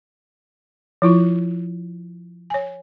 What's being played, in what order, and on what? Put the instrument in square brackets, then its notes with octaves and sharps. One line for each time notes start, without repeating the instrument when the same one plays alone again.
[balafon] F3 E4 F4
C#5 G#5